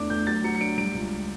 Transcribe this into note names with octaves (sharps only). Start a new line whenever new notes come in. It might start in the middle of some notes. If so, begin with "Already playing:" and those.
Already playing: E2 A3 D4 D6
A3 G6
F#3 A6
F#3 C#7
C#7
D4 D7
G3 D7
C#2